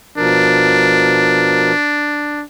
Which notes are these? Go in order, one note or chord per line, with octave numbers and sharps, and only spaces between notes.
B2 F3 D4 A#4